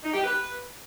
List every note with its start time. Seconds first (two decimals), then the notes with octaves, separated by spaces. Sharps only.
0.03 D#4
0.14 G4
0.24 B4